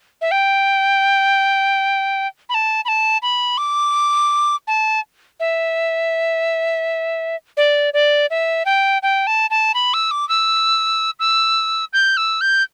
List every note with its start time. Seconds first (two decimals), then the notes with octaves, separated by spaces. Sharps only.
0.21 E5
0.31 G5
2.49 B5
2.54 A5
2.85 B5
2.88 A5
3.22 B5
3.58 D6
4.67 A5
5.40 E5
7.57 D5
7.94 D5
8.30 E5
8.66 G5
9.03 G5
9.27 A5
9.50 A5
9.74 B5
9.94 E6
10.11 D6
10.29 E6
11.19 E6
11.93 G6
12.17 E6
12.41 G6